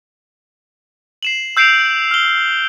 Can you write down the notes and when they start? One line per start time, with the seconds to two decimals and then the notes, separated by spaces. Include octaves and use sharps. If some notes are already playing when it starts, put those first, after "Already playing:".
1.23 C7 E7 F#7
1.57 E6 G6 C7 D7 E7 F7
2.11 F6 G7